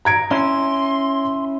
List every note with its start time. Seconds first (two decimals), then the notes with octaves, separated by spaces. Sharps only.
0.05 A#5 G#6 D7
0.31 C#4 E4 C6